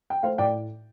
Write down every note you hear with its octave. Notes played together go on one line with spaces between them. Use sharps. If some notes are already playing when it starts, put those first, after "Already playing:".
G5
A3 C5 F5
A2 D5 G5